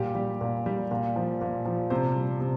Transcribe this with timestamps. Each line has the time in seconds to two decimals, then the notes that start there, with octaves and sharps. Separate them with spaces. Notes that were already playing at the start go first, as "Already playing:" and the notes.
Already playing: A#2 G3 G4
0.15 G3
0.41 A#2
0.66 G3
0.91 A#2
1.16 F3
1.41 A#2
1.65 F3
1.90 C3 C5
2.16 G3
2.41 C3